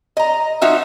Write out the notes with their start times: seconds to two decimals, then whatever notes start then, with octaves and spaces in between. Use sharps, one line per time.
0.17 D#5 A#5
0.61 F3 D#4 F#4 E5